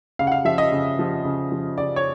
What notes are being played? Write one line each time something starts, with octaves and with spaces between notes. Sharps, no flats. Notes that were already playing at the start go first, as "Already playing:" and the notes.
C#3 F5
F#5
F5
F3 E5
D#5
C#3
F3
C#3
F3
C#3 D5
C#5